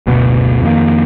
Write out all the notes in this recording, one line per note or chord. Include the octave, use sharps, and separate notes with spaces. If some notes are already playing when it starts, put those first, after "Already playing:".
F#1 D2 B2 B3
F2 D#3 A#3